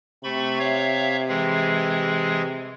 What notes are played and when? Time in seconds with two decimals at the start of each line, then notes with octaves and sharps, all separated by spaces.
0.24 C3 A3 B5 C#6
0.59 C#5 E5 F5
1.29 E3 G#3 G#4